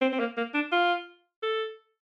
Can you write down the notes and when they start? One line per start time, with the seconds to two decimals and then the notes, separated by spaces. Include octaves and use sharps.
0.01 C4
0.12 C4
0.19 A#3
0.37 A#3
0.54 D4
0.72 F4
1.43 A4